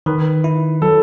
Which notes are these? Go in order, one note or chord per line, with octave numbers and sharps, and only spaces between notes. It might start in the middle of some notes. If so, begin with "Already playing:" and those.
D#3 B4
E4
F#3 A4